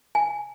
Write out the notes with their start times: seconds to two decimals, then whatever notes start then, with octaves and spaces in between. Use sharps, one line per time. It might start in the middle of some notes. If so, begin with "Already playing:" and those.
0.15 G#5